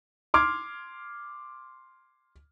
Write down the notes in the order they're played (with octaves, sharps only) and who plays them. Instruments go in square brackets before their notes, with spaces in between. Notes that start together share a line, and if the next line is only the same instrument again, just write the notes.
[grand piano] C6 D6 F6 G#6